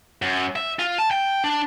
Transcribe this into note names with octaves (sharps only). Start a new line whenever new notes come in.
F#2
E5
F4
A5
G5
D4